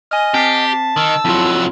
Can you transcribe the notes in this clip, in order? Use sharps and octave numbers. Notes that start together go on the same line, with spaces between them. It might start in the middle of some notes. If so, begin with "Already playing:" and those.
D#5 G#5 F6
C4 G4 A5 B6 C7
D#3 E6
F2 F#3 E4 F4